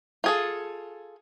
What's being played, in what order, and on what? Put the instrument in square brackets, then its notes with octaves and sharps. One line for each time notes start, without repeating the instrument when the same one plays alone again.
[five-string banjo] F4 G#4 A4